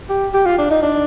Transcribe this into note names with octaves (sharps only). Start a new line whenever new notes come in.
G4
G4
F4
D4
D#4
D4